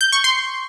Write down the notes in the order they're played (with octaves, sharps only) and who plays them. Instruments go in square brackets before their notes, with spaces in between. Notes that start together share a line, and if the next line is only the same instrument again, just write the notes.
[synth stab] G6
C#6
C6